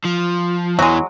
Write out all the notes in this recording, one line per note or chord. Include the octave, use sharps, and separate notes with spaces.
F3
E2 E3 F#3 G#3